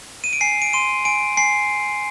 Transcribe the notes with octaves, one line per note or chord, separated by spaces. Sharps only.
D#7
D7
G#5 C7
D7
C6 D#7
G#5 D7
G#5 C7